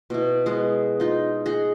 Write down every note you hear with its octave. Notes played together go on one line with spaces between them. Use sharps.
B2 E4
G#3 B3 G#4
D#4 F4
G#4 D#5 F#5